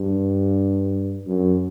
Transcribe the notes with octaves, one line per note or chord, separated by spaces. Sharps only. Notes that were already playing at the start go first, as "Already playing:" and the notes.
Already playing: G2
F#2